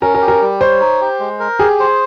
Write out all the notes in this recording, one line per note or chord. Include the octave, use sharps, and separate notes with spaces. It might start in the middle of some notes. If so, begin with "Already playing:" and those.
C#4 A#4
A#4
G4
A#4
G3
C5 C#5
D#4
G4
G#3
A#4
G4 G#4
C5